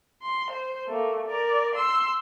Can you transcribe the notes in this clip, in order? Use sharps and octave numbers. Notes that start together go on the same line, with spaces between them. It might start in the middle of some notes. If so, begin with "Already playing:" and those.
C6
C5
A3 A#3
A#4 D5
C6 E6